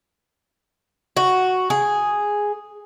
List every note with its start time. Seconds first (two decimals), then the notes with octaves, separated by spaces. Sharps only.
1.16 F#4
1.70 G#4